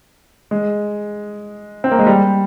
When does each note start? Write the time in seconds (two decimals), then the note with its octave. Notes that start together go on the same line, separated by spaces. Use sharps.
0.51 G#3
1.84 C4
1.91 A#3
1.99 G#3
2.06 G3